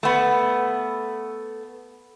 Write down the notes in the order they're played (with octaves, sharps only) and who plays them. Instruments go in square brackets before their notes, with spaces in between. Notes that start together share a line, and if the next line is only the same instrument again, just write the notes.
[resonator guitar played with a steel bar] A3 B3